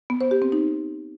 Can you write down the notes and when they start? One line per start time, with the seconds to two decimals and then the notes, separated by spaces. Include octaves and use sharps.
0.10 B3
0.21 C5
0.31 G4
0.42 C4
0.52 D#4